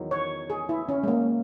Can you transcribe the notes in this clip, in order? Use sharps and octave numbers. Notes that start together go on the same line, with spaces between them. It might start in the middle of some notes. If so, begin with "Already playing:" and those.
Already playing: E2 D#3 F#3
C#5
G#4
E4
C#4
G#3
A#3